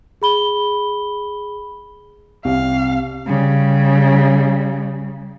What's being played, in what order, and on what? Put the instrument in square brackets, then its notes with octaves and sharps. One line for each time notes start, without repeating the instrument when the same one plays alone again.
[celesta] G#4 B5 G7
[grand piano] C2 [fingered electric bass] C4 [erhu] F5
[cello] C#3 G3